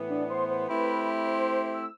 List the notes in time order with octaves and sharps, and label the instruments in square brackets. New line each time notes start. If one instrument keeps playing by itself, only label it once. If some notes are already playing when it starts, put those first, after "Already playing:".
Already playing: [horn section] A2 E3 B3
[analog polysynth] D4 D5
C5 C6
C5 C6
[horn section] A3 C4 E4 G4 [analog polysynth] B4 B5
[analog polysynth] B5
C5 C6
E6